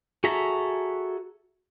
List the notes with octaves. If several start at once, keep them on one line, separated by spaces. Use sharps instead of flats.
F#4 G#4 A4 E5 A#5